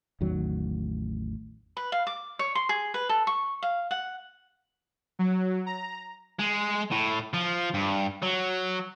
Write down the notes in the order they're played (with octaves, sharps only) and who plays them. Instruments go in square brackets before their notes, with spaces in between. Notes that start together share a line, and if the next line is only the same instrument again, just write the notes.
[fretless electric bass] A1 E2 D#3 F#3
[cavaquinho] B4
F5
D6
C#5
C6
G#4
B4
A4
C#6
F5
F#5
[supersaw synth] F#3
A#5
[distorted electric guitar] G#3
A2
F3
G2
F#3